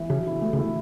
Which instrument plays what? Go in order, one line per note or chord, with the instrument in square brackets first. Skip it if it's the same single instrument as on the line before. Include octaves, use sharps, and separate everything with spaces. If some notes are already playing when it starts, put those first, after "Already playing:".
Already playing: [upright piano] E3
[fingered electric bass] C#3 [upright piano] F#3
[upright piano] E4
A3
[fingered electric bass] C#3
[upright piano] E4